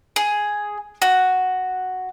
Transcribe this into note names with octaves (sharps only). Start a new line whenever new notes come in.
G#4
F#4